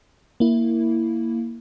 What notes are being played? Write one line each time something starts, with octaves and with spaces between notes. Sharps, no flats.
A#3 E4